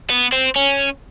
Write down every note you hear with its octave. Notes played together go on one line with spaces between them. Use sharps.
B3
C4
C#4